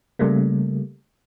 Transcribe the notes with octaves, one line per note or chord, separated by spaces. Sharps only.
C#3 G3 A3 A#3